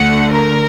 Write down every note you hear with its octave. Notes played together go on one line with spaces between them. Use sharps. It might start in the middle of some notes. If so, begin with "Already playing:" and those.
Already playing: D2 D3 A3 F#5
A#4